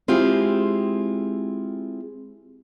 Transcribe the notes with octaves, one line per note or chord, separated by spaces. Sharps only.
G#3 C4 E4 F4 G4 G#4